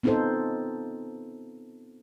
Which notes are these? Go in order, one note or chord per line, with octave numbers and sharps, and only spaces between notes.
B3 C4 D#4 F4 A4 C5